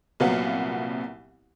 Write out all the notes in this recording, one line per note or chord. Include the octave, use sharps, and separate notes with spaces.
C2 A#2 F#3 B3 F5 F#5